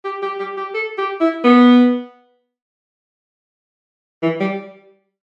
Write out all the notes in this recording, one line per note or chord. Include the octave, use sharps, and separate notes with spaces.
G4
G4
G4
G4
A4
G4
E4
B3
E3
G3